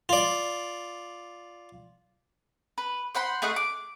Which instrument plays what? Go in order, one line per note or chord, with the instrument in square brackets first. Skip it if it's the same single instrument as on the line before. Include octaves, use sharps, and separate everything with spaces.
[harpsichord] F4 D5
[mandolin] B4
C5 F#5 B5 C6
A3 G#4 D#5 F#5
D6